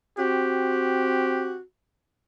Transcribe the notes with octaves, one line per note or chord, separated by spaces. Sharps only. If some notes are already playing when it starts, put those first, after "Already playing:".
C4 F#4 G4